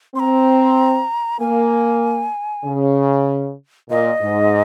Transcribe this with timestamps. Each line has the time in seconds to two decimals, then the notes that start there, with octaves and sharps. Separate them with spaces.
0.15 C4 C6
0.20 A#5
1.40 A#3 G#5
2.65 C#3
3.89 A#2 D#5
4.22 G#2